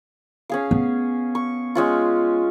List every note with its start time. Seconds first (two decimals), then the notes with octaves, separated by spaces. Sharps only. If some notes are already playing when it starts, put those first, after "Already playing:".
0.49 C#4 G#4 F5
0.71 B3
1.35 C#6
1.75 G#3 C#4 F4